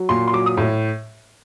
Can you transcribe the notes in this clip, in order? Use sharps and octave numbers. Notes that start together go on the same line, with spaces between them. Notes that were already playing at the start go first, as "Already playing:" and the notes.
Already playing: F#3
A#2 C6
C6
F#3 D6
D#6
A2